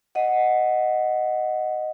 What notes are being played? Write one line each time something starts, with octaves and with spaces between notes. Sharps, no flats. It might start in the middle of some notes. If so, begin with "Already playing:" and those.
D#5 F#5